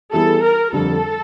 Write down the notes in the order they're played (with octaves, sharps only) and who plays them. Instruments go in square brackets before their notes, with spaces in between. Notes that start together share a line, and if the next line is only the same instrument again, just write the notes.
[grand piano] E3 G3 B3 E4 G#4 [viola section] A4
[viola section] A#4
[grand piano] F2 D3 G3 [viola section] A4